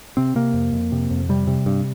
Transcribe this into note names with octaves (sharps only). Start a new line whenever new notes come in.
C3 C4
C3 A#3
F2
F2
C3
F2
C3 G3
C3
G2